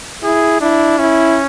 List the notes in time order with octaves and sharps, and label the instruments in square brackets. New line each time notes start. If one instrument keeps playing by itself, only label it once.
[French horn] E4 [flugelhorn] G#4
[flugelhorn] D4 [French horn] E4
[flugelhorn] C#4 [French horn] E4